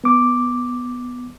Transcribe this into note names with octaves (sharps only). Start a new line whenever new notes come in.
B3 D6